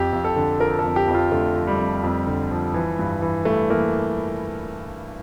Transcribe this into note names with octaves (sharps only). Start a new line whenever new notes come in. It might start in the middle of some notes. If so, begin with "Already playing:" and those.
Already playing: F2 G4
F2
A4
D3
F3 A#4
A4
F2
G4
F2
F4
D3 A3
F3
G3
F2
F2
D3
F3
E3
G2
E3
G2 A3
E3 A#3